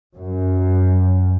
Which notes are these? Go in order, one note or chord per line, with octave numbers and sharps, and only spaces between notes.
F#2